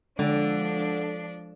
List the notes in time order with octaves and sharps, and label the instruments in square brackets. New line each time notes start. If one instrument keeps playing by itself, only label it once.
[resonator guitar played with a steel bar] D3 [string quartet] F3 D4 [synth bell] G#3